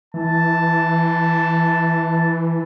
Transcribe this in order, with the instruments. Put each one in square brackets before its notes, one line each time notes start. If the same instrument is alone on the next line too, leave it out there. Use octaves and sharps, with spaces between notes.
[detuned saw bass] E3 [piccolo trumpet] A5